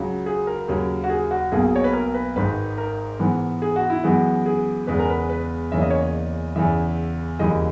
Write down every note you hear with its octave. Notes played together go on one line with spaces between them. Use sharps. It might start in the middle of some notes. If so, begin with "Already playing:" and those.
Already playing: C#2 C#3 F#3
G#4
A#4
D#2 C#3 F#3
F#4
G#4
F#4
B1 B2 A#3 G#4
C#5
B4
A#4
B4
G#1 G#2 D#3 B4
A#4
G#2 E3 B3
G#4
F#4
E4
F#2 E3 G#3 B3 F#4
G#4
E2 C#3 G#3 B3 B4
A#4
B4
B4
E2 C#3 E3 A#3 C#4 E5
D#5
C#5
D#5
E2 C#3 E3 E5
E1 D#2 C#3 E3 D#5